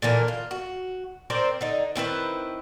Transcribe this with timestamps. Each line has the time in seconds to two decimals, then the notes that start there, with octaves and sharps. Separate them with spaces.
0.02 A#2 D3 E3 A#4
0.28 F4
0.51 F#4
1.30 C4 A#4 C5 D5
1.61 D3 D#4
1.96 D#3 C4 E4 B4